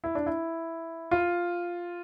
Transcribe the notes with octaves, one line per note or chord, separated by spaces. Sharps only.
E4
D4
E4
F4